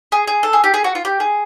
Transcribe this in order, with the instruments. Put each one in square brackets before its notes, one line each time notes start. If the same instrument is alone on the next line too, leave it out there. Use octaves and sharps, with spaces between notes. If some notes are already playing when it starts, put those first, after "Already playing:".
[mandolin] G#4
G#4
A4
G#4
G4
G#4
F#4
F4
G4
G#4